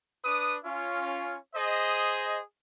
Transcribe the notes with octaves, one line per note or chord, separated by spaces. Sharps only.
D4 B4 D#6
C#4 F4
G#4 C5 D#5